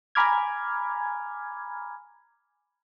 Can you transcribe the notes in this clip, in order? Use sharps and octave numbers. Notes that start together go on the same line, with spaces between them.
G#5 A#5 B5 D6 F6 G#6